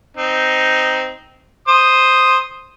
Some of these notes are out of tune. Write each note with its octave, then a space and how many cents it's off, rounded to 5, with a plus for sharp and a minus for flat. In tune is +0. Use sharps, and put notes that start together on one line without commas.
C4 -10 D#4 +0
C5 +0 D#6 +0